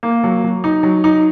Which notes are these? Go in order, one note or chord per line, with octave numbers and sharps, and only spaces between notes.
A#3
F#3
F#3
D#4
F#3
D#4